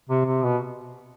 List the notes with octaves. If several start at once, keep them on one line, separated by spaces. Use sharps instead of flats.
C3
C3
B2